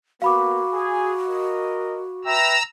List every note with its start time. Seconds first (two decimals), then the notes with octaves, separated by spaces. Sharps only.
0.22 A#3 B3 F#4 F5 B5 D6
0.73 G#4
1.26 A#4 D#5
2.25 B4 E5 G5 A#5 E6